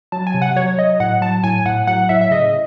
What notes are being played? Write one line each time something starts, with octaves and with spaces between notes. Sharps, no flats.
F#3 A5
G#5
C3
F#5
F#3 C#5
F#3 D#5
A2 F#5
F#3 A5
A2 G#5
A2 F#5
F#3 F#5
A2 E5
E5
C#3 D#5